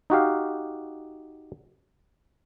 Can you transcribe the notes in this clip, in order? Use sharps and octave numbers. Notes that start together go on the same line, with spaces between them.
D#4 F#4 G4 F5